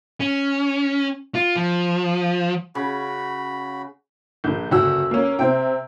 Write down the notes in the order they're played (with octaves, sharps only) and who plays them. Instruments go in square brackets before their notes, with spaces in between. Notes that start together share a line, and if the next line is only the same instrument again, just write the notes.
[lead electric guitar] C#4
F4
F3
[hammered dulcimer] C#3 [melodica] F#4 B5
[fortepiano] A#1 [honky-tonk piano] D3 G6
[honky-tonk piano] F#1 F#4 E6 [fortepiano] D2
[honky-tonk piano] A#3 C#4
[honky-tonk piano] C3 [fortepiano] C4 G5